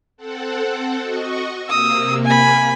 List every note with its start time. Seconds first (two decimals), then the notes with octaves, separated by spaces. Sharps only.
0.17 C4 A4 F#5
1.01 F#4 D#5 C#6
1.68 C3 A#3 D#6 E6
2.25 G#5 B5